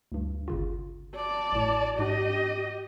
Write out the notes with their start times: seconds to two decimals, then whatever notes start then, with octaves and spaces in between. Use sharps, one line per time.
0.12 D2 G2
0.48 G1 C#3 F4
1.15 D5 A5
1.52 A1 A2
1.99 G#2 D4 G4 D#5